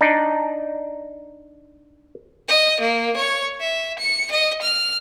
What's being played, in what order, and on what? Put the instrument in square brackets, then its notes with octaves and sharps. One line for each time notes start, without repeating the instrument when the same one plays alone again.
[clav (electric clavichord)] D4 D#4
[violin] D#5
A#3
C#5
E5
C#7
D#5
F6